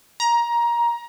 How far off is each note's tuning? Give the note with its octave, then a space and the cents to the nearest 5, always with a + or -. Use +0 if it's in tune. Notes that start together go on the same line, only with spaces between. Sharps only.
A#5 +20